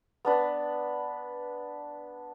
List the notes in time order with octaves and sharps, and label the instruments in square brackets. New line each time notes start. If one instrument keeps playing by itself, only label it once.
[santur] B3 D4 B4